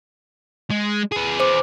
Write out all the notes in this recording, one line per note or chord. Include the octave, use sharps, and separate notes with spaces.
G#3
G#4 B4
C5 D6